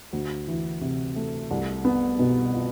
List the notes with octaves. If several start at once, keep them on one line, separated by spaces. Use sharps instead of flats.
D2
E3
C3
A3
C2
B3
B2
F4